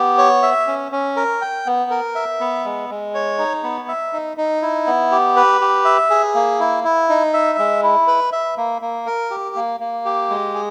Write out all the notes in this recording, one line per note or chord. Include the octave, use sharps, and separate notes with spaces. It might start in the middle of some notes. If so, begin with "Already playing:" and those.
Already playing: B3 G4
C#5
E5
C#4
C#4
A#4
G5
B3
A#4
E5
B3
G#3
G#3
C#5
D#4
B3
E5
D#4
D#4
E4
B3
G4
B4
G4
E5
G#4
A#3
E4
E4
D#4
E5
G#3
E4
B4
E5
A#3
A#3
A#4
G4
A#3
A#3
G4
G#3
G#4